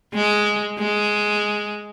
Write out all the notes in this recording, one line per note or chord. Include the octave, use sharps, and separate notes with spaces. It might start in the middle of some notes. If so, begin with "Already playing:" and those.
G#3
G#3